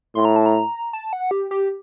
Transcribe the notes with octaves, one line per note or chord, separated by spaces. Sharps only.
A2 C6
A#5
A5
A#5
A5
F#5
G4
G4